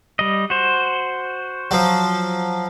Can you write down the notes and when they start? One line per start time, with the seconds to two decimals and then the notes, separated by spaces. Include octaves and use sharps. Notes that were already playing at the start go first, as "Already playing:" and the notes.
0.19 G3 D#5
0.50 F#4 C5
1.71 F3 F#3